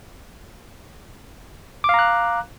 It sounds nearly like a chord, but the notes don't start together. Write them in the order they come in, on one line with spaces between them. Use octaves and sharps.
D6 F5 A#5 F#6